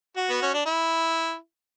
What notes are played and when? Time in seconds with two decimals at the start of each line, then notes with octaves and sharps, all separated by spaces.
0.16 F#4
0.30 B3
0.42 C#4
0.54 D4
0.66 E4